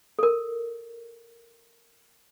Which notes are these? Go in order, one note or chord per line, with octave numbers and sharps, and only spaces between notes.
A4 A#4